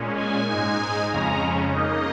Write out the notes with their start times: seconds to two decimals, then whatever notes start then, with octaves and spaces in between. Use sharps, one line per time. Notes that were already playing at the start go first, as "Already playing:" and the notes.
Already playing: A#2 G#3 C#4
0.17 G#5
0.48 G#2 G#3 D#4 G#5
1.12 F2 C#3 G#3 C#4 A#5
1.74 C#3 A#3 D#4 D#5